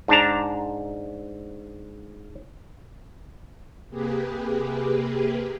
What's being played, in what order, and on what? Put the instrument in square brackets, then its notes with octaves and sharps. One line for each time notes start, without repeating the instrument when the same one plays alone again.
[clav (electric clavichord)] G#2 D4 A5 A#5
[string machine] C3 A#3 G4 G#4 B4